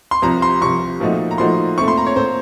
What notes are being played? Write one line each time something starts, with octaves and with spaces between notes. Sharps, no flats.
C6
C2 C3 F3 A#5
C6
C2 C3 F3 C#6
A#2 F3 A3 D#4 F#4
A#5
A#2 F3 A3 D#4 F#4 C6
A#2 A3 C4 C#6
C6
A#5
C#5
A#2 A3 C4 C5